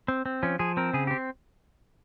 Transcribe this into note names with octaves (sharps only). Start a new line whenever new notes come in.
C4
C4
F3 C#4
F3 G#4
C4 A#4
C#3 G#4
C4 G4